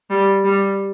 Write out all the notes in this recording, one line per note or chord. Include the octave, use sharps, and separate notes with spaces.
G3
G3